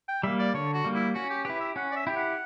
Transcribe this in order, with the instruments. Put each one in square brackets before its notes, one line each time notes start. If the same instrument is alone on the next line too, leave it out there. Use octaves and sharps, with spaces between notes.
[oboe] G5
[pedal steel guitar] G3 A#3 [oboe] E5
[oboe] D5
[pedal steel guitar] D3 [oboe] C#5
[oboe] F#4
[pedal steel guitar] G3 A#3
[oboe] E4
[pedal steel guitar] C#4 [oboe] F#4
[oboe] G4
[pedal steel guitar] E4 G4 [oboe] B4
[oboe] E5
[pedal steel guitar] C#4 [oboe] F#5
[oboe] D5
E5
[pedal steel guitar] E4 G4 [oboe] G5
[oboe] F#5